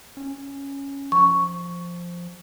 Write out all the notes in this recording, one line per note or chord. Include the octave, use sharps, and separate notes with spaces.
C#4
F3 C#6